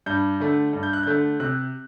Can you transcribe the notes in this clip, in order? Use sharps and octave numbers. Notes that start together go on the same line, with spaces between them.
G2 G6
D3 A3
G2
G6
F#6
D3 A3 G6
C3 F#6